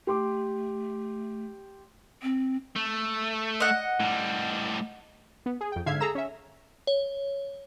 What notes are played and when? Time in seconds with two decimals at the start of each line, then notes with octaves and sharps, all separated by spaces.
0.07 A3 G4 C6 D6
2.23 C4
2.76 A3
3.60 D#5 F#5
4.00 A2 G3
5.46 B3
5.61 G#4
5.72 F2 G5
5.86 G#2 D3 E5 F5 G#6 C7
6.00 G#4 A4 A#5 E6
6.15 C#4 E5
6.87 C#5